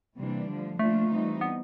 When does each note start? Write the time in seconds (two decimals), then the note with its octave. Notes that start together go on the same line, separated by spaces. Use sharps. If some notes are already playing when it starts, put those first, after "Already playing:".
0.18 C3 E3 G3 A#3 D4
0.49 D3 F3 A3
0.79 D3 F3 A3 A#3 D4 F4
1.10 E3 G3 C4 D#4
1.41 B3